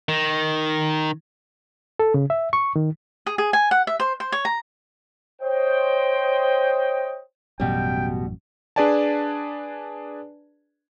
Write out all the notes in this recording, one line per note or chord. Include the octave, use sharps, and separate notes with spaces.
D#3
A4
C#3
E5
C#6
D#3
G#4
G#4
G#5
F#5
E5
C5
C5
C#5
A#5
C5 C#5 D#5 G5
A1 F#2 B2 G3 G5
D4 G#4 B4 D5 G#5 A5